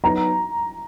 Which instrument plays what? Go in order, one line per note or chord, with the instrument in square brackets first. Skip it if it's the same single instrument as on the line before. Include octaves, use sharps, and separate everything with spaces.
[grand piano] F#3 B3 D#4 F#4 [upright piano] A#5